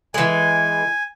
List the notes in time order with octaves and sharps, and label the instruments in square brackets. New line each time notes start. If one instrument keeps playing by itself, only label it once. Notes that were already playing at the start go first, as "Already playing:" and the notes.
[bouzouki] E3 G#3 [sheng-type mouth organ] G#5